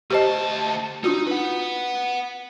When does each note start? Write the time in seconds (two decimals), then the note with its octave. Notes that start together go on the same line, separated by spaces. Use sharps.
0.11 D2 G4 C5 D#5 A5
1.04 D4 D#4 F4 F#4
1.27 B4 F#5